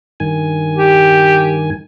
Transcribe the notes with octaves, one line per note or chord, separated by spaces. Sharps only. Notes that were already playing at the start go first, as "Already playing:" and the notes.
G2 D#3 G#5
G4